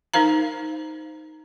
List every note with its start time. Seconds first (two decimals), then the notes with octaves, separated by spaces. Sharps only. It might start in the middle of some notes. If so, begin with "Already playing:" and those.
0.14 D#4 A#4 C5 F5 A#5